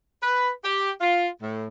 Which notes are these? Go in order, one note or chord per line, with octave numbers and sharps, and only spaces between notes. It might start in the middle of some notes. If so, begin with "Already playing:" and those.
B4
G4
F4
A2